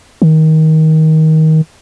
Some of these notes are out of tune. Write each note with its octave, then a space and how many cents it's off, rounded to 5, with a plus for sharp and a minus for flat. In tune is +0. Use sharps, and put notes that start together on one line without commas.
D#3 +20